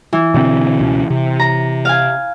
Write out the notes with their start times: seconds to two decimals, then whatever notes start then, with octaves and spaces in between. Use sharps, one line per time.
0.13 E3
0.34 B2 D3 C4
0.79 C#2 B2 C#4
1.10 C3
1.40 A#5
1.85 F5 G#5